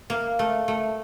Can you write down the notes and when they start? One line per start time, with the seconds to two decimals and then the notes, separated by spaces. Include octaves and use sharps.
0.10 A#3
0.39 A3
0.68 A3